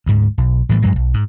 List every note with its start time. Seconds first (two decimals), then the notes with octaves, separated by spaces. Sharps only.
0.06 D2 G#2
0.38 B1
0.69 A2 E3 G3
0.82 G2 F#3 G#3
0.96 B1
1.14 G#2